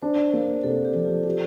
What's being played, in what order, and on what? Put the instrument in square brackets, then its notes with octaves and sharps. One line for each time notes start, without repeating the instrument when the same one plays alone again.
[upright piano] D4 [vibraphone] C5
[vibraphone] D5
C5
[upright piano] A#3
[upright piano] C3 [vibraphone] A4
[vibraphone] G4
[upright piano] F3
[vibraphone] F4
[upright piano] G4